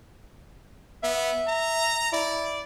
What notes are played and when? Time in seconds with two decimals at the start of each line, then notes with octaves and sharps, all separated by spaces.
1.03 B3 E5
1.48 A#5
2.13 E4 D5